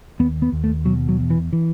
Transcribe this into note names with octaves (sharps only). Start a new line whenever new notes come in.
D#2 B3
B3
D#2
A3
B2 F#3
F#3
E2
E3
E3